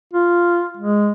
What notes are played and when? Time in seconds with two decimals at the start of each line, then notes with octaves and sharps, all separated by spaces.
0.13 F4
0.77 G#3